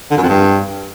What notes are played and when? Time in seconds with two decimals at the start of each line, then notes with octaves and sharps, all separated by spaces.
0.11 D3
0.17 F#2
0.23 F2
0.29 G2